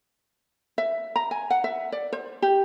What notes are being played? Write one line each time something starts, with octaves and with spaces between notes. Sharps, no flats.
E5
A#5
G#5
F#5
E5
D5
C5
G4